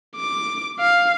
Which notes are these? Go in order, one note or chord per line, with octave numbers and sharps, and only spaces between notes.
D6
F5